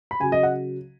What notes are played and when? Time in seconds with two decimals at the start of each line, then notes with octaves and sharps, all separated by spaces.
0.11 B5
0.20 C#3 G#5
0.23 F#3
0.32 D#5
0.43 F#5